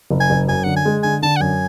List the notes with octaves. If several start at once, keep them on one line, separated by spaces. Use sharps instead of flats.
F#1
G#5
F#1
F#2 G#5
D3 F#5
G#5
G#3
D3 G#5
D3 A5
F#5
F#2 G#5